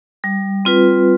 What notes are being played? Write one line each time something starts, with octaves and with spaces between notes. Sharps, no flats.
G3
C4 F4 B4